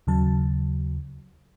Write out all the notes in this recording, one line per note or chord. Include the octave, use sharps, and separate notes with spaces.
D#2 C#3 F#3 A5